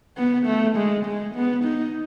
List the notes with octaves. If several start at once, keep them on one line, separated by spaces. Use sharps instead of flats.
B3
A3
G#3
G#3
B3
D#4